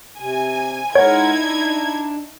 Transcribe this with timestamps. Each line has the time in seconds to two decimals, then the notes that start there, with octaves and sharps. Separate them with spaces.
0.19 C3 G#5
0.95 G#3 D#4 E4 A#4 C#5 F#5 G#6
1.38 D4